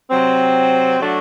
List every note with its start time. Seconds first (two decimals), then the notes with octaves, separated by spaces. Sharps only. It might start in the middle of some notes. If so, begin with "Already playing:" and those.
0.10 C3 F#3 C4
1.00 F#3 A3 D4 F#4